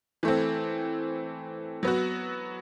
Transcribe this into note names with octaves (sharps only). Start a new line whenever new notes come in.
E3 A3 C4
F#3 B3 F#4